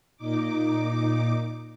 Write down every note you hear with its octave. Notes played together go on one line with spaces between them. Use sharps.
A#2 D#4 D6